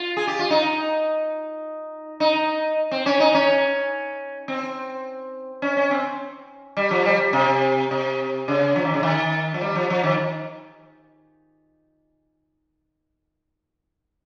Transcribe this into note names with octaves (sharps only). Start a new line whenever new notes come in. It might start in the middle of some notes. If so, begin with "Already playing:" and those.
Already playing: F4
G#4
G4
F4
D#4
D#4
C4
C#4
D#4
C#4
C4
C#4
C#4
C4
G3
F3
G3
C3
C3
C#3
F3
D#3
C#3
D#3
F3
G3
F3
F3
D#3